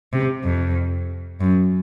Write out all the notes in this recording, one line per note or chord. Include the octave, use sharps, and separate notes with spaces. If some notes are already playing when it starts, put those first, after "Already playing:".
C3
F2
F#2